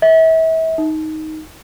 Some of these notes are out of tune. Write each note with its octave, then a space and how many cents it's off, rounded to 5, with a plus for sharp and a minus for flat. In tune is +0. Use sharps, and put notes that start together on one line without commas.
E5 -35
D#4 +10